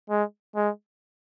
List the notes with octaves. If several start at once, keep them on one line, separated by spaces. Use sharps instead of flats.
G#3
G#3